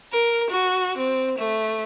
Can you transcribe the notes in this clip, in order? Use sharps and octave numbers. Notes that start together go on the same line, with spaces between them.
A#4
F#4
C4
A3